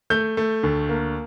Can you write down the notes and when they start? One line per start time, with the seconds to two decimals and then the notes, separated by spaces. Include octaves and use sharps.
0.10 A3 G6
0.37 A3
0.63 D2
0.89 A#3